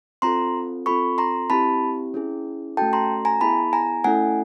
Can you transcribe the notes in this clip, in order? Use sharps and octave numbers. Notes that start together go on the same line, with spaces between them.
C4 F4 A4 A#5 C6
C4 F4 A4 B5 C#6
A#5 C6
C4 E4 G4 A5 B5
C#4 E4 G#4
A3 C#4 F#4 A4 G5 A5
A#5 C6
G#5 A#5
B3 E4 G#4 A5 B5
G#5 A#5
A3 C#4 E4 A4 F#5 G#5